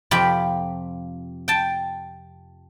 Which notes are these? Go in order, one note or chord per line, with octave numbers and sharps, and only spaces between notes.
F2 C3 F4 G5 B5
G5 A5